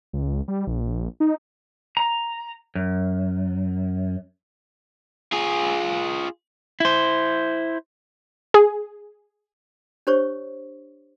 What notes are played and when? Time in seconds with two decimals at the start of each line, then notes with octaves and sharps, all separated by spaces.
0.13 C#2
0.48 G3
0.67 A#1
1.20 D#4
1.97 A#5
2.75 F#2
5.33 F4 G#4
6.80 E4 C5
8.54 G#4
10.07 D4 G4 C5 C#5 C#6